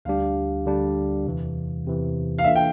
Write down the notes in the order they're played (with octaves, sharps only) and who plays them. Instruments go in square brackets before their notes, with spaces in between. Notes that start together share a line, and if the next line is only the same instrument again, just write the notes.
[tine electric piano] D2 D3 G3 D4 G4 [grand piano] F5
[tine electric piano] D2 D3 G3 D4 G4
E2 C3 E3
E2 C3 E3
[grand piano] F5
[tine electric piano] E3 A#3 D4 F4 A4 [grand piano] E5
[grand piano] G5